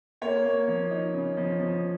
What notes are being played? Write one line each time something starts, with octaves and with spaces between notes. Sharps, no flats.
A#3 C#5
A#3
F3
D#4
C#3
F3
F3